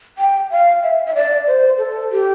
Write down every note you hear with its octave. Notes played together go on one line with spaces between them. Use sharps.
G5
F5
E5
E5
D5
C5
A4
G4